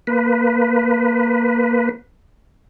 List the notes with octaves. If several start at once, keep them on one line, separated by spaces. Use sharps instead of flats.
A#3 B4